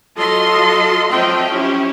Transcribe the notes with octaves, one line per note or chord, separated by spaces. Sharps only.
F#3 F4 A4 D#5 C6
F3 F#3 C4 D#5 E5 G5
C#4 E4 G4